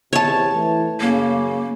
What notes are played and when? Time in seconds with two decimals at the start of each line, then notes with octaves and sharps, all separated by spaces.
0.13 E2 C3 C#5 A5
0.53 E3 A3 E4
1.00 F#2 C#3 A#3